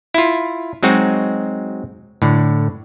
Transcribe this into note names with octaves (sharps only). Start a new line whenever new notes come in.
E4 F4
F#3 G#3 C4 D#4 F#4
A2 D3